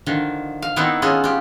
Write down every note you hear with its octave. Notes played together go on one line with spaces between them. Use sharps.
D3 D#3 F3
F5
D#3 B3 C4 D#4 E4
B3 C#4 F4 G#4 A4 D#5
F4 G4